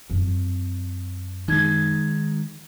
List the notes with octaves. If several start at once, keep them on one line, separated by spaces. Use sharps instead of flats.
F#2 C4
D#3 G#3 D#4 G#6